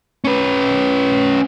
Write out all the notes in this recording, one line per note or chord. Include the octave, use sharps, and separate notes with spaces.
C#4 B4